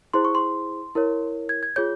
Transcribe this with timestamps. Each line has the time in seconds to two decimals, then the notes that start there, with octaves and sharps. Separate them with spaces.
0.14 E4 G#4 C5 C6
0.25 C#6
0.35 C6
0.95 E4 A#4 C#5
1.49 G#6
1.63 G#6
1.76 F4 G#4 C#5 G6